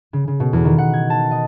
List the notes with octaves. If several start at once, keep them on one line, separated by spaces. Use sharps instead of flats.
C#3
C#3
B2
E2
D#3
F#5
G#6
A5
D#5